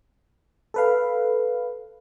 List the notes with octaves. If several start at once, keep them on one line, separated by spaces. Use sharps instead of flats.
A4 B4 F5